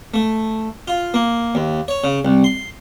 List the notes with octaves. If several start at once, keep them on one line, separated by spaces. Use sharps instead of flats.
A3
F4
A#3
D#2
C#5
C#3
C2
C6